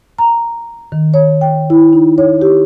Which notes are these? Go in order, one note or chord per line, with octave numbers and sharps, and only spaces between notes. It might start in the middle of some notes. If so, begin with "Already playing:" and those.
A#5
D#3
C#5
G5
E4
D#4
C#5
G4